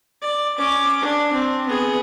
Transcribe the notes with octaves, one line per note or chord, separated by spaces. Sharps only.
D5
C#4 D6
D4
C4
B3 G#4